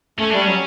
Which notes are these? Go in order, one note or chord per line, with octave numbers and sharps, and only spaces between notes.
A3 C#4
G3 D4
F#3 C#4